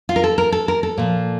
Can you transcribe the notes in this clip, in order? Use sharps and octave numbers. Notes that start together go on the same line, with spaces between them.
F4
A#4
A4
A#4
A4
A#4
A4
A#2 F3